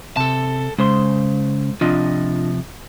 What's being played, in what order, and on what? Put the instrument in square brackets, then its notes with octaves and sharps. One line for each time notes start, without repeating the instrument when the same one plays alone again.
[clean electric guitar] C3 [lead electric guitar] A4 A5
[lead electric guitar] C#3 [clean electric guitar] G#3 C5 C6
[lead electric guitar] C3 F3 [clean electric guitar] D4 F4 D#5